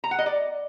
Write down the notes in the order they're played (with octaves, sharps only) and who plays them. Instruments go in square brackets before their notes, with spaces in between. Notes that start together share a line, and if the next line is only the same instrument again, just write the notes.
[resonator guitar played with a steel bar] A#5
F#5
D#5
D5